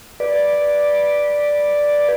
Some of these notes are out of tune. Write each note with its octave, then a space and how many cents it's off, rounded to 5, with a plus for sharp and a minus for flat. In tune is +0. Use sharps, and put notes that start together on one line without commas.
B4 -10 D5 +0